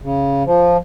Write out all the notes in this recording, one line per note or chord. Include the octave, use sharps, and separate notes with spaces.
C#3
F3